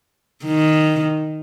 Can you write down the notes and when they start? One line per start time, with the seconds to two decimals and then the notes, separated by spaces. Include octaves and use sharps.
0.44 D#3